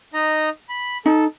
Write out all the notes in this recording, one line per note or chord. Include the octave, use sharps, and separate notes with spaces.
D#4 D#5 A#5
B5
D#4 A4